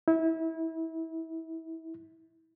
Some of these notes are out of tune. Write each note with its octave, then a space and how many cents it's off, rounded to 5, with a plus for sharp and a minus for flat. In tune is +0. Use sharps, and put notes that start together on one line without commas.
E4 -25